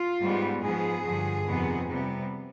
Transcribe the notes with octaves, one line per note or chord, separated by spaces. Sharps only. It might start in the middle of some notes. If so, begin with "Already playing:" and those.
Already playing: F4
G#2 G3 B3
G#2 F3 B3 G#4
G2 D3 F3
F2 C3 D#3 B3
C3 G3 B3